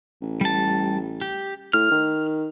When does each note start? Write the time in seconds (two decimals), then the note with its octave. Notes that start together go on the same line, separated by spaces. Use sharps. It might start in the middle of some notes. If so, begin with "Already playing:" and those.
0.22 A1
0.41 G3 A5
1.21 G4
1.73 A2 F6
1.91 D#3